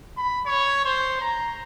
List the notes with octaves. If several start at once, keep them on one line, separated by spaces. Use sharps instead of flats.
B5
C#5
C5
A#5